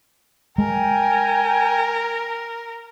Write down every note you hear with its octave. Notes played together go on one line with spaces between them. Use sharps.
G#3 A#4 G5 G#5